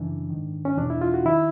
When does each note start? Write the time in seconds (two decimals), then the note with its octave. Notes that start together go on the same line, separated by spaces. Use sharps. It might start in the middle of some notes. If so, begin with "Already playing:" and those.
Already playing: F#2 C#3 E3 D4
0.30 G#2 D#3
0.65 C#4
0.77 E2 B2 D4
0.90 E4
1.01 F4
1.14 F#4
1.25 D#3 E4